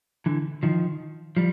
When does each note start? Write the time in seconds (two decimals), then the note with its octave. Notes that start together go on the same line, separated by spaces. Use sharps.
0.26 D3 E3
0.63 D#3 F3
1.37 F3 G3